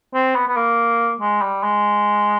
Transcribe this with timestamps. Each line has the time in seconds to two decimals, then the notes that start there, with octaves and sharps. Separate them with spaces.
0.14 C4
0.35 B3
0.48 B3
0.56 A#3
1.20 G#3
1.41 G3
1.63 G#3